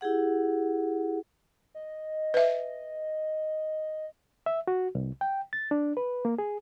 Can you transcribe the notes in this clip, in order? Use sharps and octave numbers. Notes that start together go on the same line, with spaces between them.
E4 G4 G#4 F#5
D#5
B4 E5
E5
F#4
C2
G5
A6
D4
B4
A#3
G#4